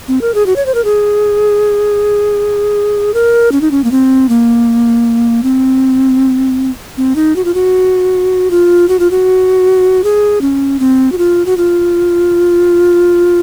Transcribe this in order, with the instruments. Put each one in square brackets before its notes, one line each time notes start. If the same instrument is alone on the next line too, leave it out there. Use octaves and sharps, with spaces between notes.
[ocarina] C4
A#4
G#4
F#4
C#5
C5
A#4
G#4
A#4
C#4
D#4
C#4
A#3
C4
A#3
C4
C4
D#4
F#4
F4
F#4
F4
F#4
F4
F#4
G#4
C#4
C4
F#4
F4
F#4
F4